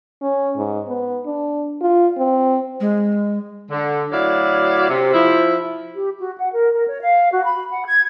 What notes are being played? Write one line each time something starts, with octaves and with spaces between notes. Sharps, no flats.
C#4
G#2
B3
D4
F4
C4
G#3
D3
D2 F#3 E4 F#4 D5 F5
C3
F3 E4
G4
F#4
F#5
A#4
A#4
C#5
F5
F#4
B5
F#5
G#6